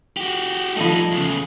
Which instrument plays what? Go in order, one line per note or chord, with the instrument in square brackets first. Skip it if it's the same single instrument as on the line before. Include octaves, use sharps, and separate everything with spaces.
[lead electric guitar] F#4 G4
[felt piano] F3 A3 [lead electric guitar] G3 D#4
[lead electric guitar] E2 C#3